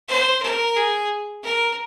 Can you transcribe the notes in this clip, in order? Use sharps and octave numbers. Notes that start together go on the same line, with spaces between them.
C5
A#4
G#4
A#4